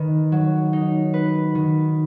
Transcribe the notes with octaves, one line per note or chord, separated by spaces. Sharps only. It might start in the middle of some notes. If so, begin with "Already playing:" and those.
Already playing: D#3 B4
F#3
D#4
B4
D#3